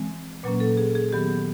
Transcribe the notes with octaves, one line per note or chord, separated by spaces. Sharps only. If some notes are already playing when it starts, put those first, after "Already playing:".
Already playing: E3 G#3 C4
A#2 F#3 A#3 C#4 B4
A4
G#4
G#4
D#3 F#3 B3 G4